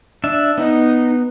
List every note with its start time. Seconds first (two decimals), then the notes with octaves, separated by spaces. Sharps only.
0.24 D4 E5
0.58 B3 D#4